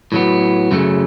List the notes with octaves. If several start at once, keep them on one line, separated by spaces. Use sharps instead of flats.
A2 F#3 B3
F#2 C#3 F#3 A3